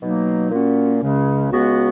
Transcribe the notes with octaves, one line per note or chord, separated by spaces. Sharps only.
B2 F#3 A#3 D#4
A#2 A#3 C#4 F#4
C#2 C#3 G#3 C#4
C#2 C#3 G#3 B3 F#4